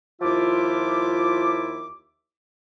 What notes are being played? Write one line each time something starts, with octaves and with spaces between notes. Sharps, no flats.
D#2 F3 E4 F4 E5 D6